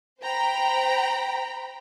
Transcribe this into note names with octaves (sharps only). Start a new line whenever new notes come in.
C5 G5 A#5 B5